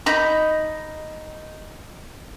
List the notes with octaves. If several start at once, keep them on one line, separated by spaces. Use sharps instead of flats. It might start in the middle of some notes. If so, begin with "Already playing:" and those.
D#4 B5